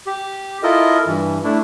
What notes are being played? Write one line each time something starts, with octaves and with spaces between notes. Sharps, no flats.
G4
E4 F4 A4 A#4 D#5
G2 E3
A3 D4 E4